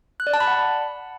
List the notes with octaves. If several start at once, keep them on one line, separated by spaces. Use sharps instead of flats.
F#6
D5
A5
B5
F#5